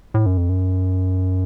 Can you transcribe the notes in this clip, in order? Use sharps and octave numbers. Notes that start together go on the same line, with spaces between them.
A2
F#2
F2
F#2